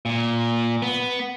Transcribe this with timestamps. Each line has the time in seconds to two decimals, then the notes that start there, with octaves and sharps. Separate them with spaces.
0.06 A#2
0.82 B3